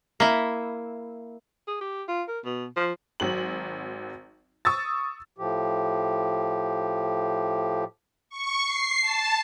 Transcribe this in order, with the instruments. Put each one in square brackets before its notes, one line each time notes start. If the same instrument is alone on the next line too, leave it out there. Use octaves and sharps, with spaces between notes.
[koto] A#3 E4
[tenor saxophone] G#4
G4
F4
A#4
B2
F3
[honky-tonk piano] G#1 F#3 F#7
C#6 D#6 E6 A6
[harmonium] A2 F3 G4
[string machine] C#6
C7
A5